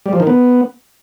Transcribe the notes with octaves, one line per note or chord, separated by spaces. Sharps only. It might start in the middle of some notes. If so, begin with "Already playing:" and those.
G3
F3
D#3
B3